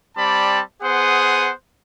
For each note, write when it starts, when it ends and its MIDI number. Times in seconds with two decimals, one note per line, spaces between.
0.17 0.61 55
0.17 0.61 60
0.17 0.61 74
0.17 0.61 81
0.17 0.61 83
0.83 1.52 59
0.83 1.52 68
0.83 1.52 72
0.83 1.52 78
0.83 1.52 87